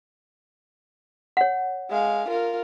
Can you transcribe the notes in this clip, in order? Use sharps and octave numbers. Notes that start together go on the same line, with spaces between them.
C#5 F#5
G#3 F5
F4 A#4